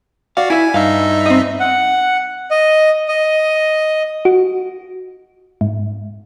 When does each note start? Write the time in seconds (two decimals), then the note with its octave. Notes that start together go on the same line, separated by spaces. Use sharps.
0.37 F#4 D5 F5
0.50 E4 E5 G#5
0.74 G2 D#4 E5 F5
1.26 C4 D#5
1.60 F#5
2.51 D#5
3.08 D#5
4.25 F#4
5.61 G#2